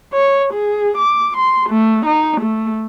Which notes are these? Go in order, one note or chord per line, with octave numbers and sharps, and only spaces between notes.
C#5
G#4
D6
C6
A3
D#4
A3